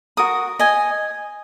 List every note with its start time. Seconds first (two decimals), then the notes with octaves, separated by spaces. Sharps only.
0.17 F#4 A#4 D#6
0.59 D#5 G#5